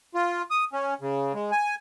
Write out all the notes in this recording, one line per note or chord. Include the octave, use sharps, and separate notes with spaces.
F4
D#6
C#4
C#3
G#3
G#5